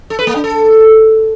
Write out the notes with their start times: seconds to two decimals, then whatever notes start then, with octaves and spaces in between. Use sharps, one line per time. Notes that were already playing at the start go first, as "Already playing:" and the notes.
0.10 A4
0.19 B4
0.27 A#3
0.35 D4
0.44 A4